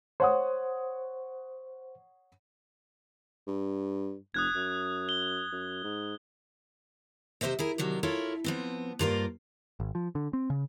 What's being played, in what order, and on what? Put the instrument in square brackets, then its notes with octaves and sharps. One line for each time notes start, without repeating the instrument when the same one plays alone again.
[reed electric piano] C5 [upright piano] C#5 F#5 D#6
[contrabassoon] G2
[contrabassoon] F1 [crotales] D#6 F#6 G#6
[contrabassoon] F#2
[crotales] G7
[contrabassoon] F#2
G#2
[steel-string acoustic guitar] C3 F3 C5 D#5 E5
E4 G#4 A#4
C3 D#3 F#3 D4
E4 F4 A4 A#4 C#5
F3 B3 C4
G2 A#3 F4 A#4 C5 D5
[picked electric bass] G#1
F3
D3
C4
C#3